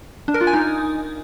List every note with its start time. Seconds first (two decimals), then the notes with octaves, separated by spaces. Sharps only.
0.28 D4
0.34 A#4
0.41 F4
0.47 G#5
0.53 D#4